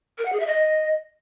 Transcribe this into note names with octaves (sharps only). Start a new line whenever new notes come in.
A#4
F#5
G#4
E5
D#5